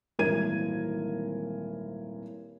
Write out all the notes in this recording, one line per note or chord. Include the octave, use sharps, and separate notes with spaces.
D#1 G#1 E3 A#4 G#6 D#7